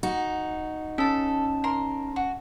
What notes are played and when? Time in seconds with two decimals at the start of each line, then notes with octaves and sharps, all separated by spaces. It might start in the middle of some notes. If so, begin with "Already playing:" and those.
0.03 D#4 F#4
0.98 C#4 A4 A5
1.64 A#4 C6
2.16 F#4